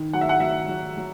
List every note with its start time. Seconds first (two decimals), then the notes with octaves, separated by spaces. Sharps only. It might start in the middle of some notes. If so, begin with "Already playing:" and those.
Already playing: D#3
0.13 F#3 F#5
0.21 E5
0.29 F#5
0.40 F#3 E5
0.68 F#3
0.97 F#3